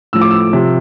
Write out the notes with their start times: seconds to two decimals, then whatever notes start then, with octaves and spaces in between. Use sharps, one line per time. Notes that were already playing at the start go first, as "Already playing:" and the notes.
0.13 A2 F3 E6
0.21 D6
0.31 E6
0.53 C3 F3